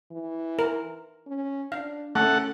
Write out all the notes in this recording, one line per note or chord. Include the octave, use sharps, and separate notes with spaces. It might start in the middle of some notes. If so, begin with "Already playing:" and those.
E3
A#4
C#4
D4 F5
A3 C#4 A4 F#5